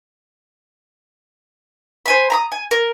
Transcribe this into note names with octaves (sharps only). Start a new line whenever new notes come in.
C5 G#5 B5
A#5 B5 D#6
G#5
A#4